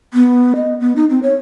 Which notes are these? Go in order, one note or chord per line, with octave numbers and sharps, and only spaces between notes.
B3
D#5
B3
D#4
C4
C#5